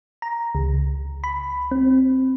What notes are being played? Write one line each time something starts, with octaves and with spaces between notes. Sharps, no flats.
A#5
C#2
B5
C4